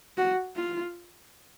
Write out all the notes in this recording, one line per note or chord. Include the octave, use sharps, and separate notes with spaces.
F#4
F4